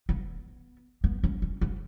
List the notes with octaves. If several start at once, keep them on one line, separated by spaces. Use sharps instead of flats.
B3
B3
C#4
C#4
C4